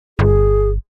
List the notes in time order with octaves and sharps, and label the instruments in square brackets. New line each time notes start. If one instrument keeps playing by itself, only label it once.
[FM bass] G1 [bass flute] G#4